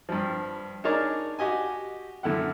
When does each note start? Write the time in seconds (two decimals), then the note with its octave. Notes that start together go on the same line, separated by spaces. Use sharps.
0.09 G2 F3
0.84 D4 D#4 G#4 A#4 C#5 D5
1.39 F#4 G4 D#5 G#5
2.23 F#2 D3 E4 F#5